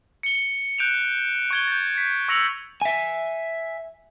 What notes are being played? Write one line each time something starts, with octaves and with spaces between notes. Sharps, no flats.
C#7 G7
F#6 G6 D7 E7 F7
C#6 G#6 G7
G6 A6
B6
C#6 E6 A#6 C#7 F7 F#7
E5 G#5